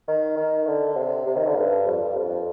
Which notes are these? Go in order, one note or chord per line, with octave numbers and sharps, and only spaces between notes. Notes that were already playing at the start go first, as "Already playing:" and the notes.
D#3
D#3
D3
C3
C3
D#3
D3
G2
F2
G2
F2